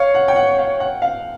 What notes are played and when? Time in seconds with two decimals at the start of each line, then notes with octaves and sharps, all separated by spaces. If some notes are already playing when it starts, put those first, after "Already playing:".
Already playing: C#5 F5
0.14 F#5
0.28 G5
0.36 F#5
0.59 F5
0.80 F#5
1.02 F5